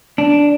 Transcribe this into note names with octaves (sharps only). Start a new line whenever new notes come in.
D4